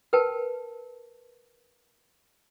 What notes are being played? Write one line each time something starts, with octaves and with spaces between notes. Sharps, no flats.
A#4 B4 G5 A5